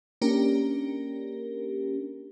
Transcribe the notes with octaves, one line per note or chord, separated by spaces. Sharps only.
A#3 C#4 D4 G4 A#4